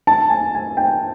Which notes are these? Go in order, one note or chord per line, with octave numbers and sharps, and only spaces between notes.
A5
G#5
G#5
G5